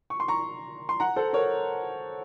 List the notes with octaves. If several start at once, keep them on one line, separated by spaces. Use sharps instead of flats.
C#6
C6
A#5 C#6
C6
F#5 A#5
A4 C5
A#4 C#5